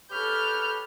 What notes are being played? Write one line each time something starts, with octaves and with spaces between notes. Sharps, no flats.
G4 A4 B4 C#5 F6 G6